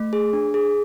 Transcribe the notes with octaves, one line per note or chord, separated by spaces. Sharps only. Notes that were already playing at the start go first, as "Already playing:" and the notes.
Already playing: A3
G#4
D4
G#4